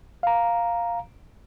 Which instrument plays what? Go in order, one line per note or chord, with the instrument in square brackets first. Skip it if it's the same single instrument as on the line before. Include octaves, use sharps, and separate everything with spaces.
[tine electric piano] F5 A#5